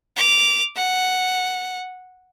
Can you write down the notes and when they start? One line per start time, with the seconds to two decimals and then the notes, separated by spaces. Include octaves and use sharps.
0.16 D6 F7
0.76 F#5